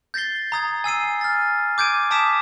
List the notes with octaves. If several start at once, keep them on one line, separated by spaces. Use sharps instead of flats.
G6 A6 A#6 C7 G7
A#5 D#6 G#6
G#5 E6 C7 D#7
F6 A6
D6 G6 G#6 D7 D#7
A5 D6 D#6 B6 D7 E7